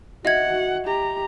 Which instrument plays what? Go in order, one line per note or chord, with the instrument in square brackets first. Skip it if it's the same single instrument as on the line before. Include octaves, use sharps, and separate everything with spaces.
[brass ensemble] F#4 [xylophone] D#5 E5 G#6 [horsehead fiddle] F#5
[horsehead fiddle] G4 A#5